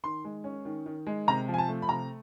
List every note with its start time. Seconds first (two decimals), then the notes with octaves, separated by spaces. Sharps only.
0.03 D#3 C6
0.25 G#3
0.44 C#4
0.65 D#3
0.86 D#3
1.07 G#3
1.27 C3 A#5
1.48 F3
1.54 G#5
1.58 A5
1.68 A3
1.82 B5
1.89 C3 A#5